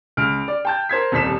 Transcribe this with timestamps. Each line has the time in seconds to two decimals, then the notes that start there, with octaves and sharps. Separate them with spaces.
0.17 C#2 F6 D7
0.48 D5
0.65 G5 A5 G6
0.89 A#4 C5 G#6 B6
1.12 D#1 C2 G3 B6 E7